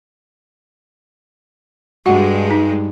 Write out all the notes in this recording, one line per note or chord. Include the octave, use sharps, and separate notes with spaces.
G2 G#3 F#4 F#5
D#4